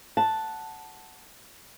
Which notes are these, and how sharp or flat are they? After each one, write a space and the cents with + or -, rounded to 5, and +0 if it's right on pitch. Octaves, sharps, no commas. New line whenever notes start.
F#5 +0 A5 +0